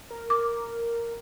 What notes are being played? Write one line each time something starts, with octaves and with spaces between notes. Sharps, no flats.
A#4
D6